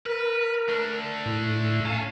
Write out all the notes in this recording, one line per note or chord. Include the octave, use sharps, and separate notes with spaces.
A#4 B4
A3 D4
A2
C#4 F5 G#5 A5